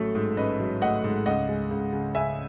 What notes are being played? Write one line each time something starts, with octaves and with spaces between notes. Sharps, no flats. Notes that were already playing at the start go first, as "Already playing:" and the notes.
Already playing: A1 F#3 A3 A4
G#2
A1 B4 D#5
F#3
A3 D#5 F#5
G#2
C#2 D#5 F#5
G#3
C#2
C#3
C#2 E5 G#5